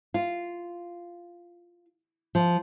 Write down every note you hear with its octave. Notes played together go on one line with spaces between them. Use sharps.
F4
F3